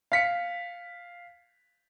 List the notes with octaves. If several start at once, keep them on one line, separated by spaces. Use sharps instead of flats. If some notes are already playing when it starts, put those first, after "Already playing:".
F5 B6 C#7